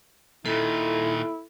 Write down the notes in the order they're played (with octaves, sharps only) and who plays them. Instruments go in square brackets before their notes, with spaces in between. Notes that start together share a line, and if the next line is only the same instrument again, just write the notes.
[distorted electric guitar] A#2 D#3 [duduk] E4 [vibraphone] A4